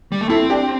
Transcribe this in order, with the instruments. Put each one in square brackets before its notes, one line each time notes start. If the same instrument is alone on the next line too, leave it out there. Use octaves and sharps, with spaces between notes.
[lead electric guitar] G3
A3
[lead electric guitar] C4 [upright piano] E4 A4
[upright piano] D4 G4